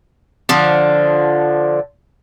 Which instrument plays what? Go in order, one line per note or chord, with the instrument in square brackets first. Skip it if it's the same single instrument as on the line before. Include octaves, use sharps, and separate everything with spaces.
[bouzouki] D3 F3